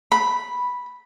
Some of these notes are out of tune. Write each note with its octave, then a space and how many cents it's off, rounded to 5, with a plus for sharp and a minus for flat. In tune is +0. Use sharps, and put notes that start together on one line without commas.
B5 -5